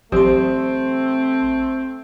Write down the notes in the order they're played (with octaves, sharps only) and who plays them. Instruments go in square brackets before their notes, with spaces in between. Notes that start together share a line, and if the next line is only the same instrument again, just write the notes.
[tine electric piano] A1 C6 [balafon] F#3 G4 C5 [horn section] A3 C4